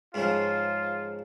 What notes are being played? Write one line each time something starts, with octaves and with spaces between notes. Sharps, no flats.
G#2 C#3 F3 F4